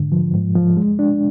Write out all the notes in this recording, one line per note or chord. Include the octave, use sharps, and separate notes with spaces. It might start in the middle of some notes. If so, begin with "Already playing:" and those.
Already playing: G#2 D3
F3
G#2
F3
G#3
D4